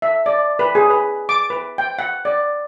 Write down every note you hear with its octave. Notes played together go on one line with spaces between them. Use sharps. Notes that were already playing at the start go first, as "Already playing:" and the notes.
E5
D5
B4
G#4
B4
D6
B4
G5
F#5
D5